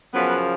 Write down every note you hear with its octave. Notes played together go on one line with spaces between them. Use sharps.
F#2 C#3 F3 B3 B4